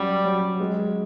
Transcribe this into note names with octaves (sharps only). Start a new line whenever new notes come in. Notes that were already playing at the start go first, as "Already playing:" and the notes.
Already playing: F#3 G3 C#4
F#3
G#3